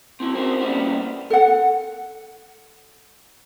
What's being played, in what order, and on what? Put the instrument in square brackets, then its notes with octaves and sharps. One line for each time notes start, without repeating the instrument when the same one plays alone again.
[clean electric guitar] C4 E4 F#4
C4 C#4 F#4 G#4 A#4 C5
G3 A#3 B3 C#4 E4
[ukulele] A4 F#5